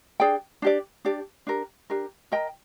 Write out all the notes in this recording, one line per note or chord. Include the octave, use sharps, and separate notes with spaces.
D4 G#4 D5 G5
D4 G4 D5
D4 G4 D5
D4 G4 A#4
D4 G4 A#4
A#4 D#5 G5 A#5